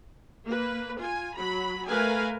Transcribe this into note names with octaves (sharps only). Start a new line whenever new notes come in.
A#3 B4
F4 G#5
F#3 F#4 B5
A3 A#4 B4 F5 G#5